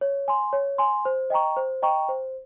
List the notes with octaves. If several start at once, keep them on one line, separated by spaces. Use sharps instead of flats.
C#5
G#5 C6
C#5
G#5 C6
C5
D#5 G5 A#5 C#6
C5
D#5 G5 A#5 C#6
C5